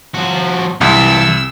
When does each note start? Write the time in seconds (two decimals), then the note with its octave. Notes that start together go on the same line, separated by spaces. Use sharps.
0.15 F3 F#4
0.81 C2 E3 F4 E6